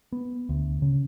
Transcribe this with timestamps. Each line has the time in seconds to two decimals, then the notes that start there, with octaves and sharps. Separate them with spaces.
0.12 B3
0.49 D2
0.82 C#3